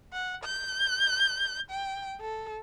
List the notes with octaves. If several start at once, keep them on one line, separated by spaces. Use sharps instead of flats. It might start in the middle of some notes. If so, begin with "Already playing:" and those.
F#5
G6
G5
A4